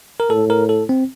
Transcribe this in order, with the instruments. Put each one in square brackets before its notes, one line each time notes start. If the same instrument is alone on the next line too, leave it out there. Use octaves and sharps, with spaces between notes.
[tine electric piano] A#4
[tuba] A2 [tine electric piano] A4
[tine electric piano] A#4
A4
C4